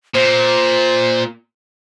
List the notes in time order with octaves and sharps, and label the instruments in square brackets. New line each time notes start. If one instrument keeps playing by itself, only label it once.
[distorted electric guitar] A#2 [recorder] C5